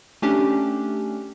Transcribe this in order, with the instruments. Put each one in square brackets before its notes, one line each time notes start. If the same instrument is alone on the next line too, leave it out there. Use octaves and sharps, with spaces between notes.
[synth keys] A3 C#4 D4 G4